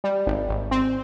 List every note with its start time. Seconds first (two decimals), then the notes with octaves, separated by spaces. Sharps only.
0.04 G3
0.27 G#1
0.49 G#1
0.71 C4